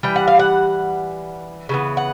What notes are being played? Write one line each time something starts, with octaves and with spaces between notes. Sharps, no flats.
E3 G3 G5
F#5
F5
F#5
C#3 E3 B3
F#5